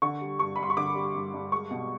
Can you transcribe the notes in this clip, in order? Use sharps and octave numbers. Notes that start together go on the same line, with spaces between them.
D3 C#6
G3
G2 C#6
B5
G2 C6
C#6
D3 D6
G3
G2
G2
G#3 C#6
B2